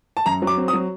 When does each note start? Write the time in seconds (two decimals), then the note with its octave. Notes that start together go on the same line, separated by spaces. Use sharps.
0.17 A5
0.26 F#2 A#5
0.42 F#3
0.47 D6
0.57 C4
0.68 D#6
0.73 F#3